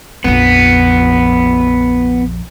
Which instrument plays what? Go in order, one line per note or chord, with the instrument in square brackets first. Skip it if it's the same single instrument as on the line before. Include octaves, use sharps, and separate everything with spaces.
[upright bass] A#1 F2 [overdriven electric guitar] B3